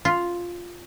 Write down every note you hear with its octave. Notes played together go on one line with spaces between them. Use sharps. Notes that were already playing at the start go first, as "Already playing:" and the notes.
F4